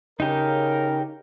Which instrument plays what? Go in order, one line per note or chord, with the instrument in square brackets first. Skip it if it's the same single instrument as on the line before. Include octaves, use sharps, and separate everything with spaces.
[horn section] C#3 A#4 [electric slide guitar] D#4 G4